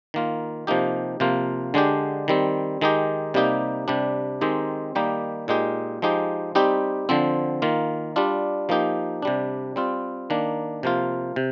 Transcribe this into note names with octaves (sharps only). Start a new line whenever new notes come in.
D#3 A#3 F4
C3 F3 A#3 D#4 G4
C3 F3 A#3 F4
D3 G#3 D4 G4
D#3 G3 C4
D#3 G#3 D#4 G4
C3 G3 A#3 D#4 G4
C3 G3 D4
D#3 G#3 C4 D#4 G4
D#3 G3 A#3 D#4 G4
A#2 G#3 D#4 G4
F3 G#3 D#4 G4
G3 C4 D#4 G4
D3 F3 C4
D#3 A#3 F4
G3 D4 F4
F3 A#3 D#4 G4
C3 G3 D4
G3 C4 F4
D#3 A#3 D4
C3 F3 A#3 F4
C3